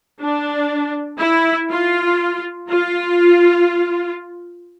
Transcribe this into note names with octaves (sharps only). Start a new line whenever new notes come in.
D4
E4
F4
F4